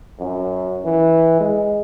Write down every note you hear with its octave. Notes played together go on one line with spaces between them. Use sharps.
F#2
E3
G#3